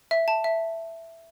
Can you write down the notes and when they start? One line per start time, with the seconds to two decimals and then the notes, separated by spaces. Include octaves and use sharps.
0.11 E5
0.28 A5
0.44 E5